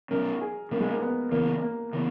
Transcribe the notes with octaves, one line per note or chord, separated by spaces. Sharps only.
B2 F#3 C#4 A#4
G#4
B2 F#3 A#3 C#4
G#3
A#3
B3
C#3 E3 A#3 B3
A#3
C#3 E3 B3